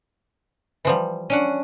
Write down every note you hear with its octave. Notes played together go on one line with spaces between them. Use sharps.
E3 F3 G3
C#4 D4 F#5